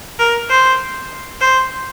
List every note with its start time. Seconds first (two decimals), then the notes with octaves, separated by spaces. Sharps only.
0.20 A#4
0.50 C5
1.41 C5